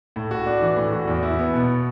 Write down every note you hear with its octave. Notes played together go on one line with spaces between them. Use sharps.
A2
F#4
D4
E3
A2
F#4
E2
E4
B3
B2